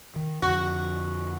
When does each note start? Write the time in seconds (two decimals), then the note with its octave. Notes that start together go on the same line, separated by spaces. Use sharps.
0.16 D#3
0.42 F2 D3 F3 F#4